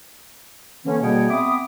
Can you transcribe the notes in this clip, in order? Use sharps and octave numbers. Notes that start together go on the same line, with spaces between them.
D3 E3 A#3 C#4
B2 G3 A#3 G#4 F#5 G5
B3 C4 E5 D6 D#6